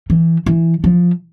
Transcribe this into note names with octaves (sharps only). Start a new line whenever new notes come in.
E3
E3
F3